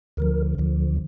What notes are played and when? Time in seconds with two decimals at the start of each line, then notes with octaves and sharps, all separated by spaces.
0.17 D2 D3 F3 A#4
0.58 D2 D3 F3